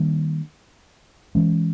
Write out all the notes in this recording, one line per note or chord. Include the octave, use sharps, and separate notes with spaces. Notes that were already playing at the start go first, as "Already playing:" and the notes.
Already playing: D#3 G3 A#3 D4
E3 G#3 C#4